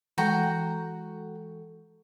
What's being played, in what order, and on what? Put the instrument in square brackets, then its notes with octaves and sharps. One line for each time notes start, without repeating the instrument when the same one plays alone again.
[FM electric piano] E3 G#3 A4 [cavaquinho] F#4 G5 A#5